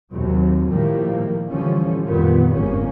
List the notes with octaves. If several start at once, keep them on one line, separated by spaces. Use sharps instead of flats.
D#2 C3 F#3
A2 D#3 F3 G3 A#3
D3 E3 F3 G3 C#4
F2 A#2 D#3 G3 A#3 B3
G1 F2 G#2 A#3 C#4